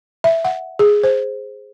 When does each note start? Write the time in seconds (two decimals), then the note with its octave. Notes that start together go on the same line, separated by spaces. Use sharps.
0.24 E5
0.45 F#5
0.79 G#4
1.03 C5